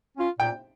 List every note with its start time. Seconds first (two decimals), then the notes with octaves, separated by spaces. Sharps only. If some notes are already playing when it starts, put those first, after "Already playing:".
0.16 C#4 F4
0.39 A#2 G5